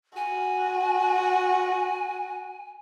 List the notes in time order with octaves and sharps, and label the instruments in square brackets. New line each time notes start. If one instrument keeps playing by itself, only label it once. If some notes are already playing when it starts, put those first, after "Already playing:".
[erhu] F#4 [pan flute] G#5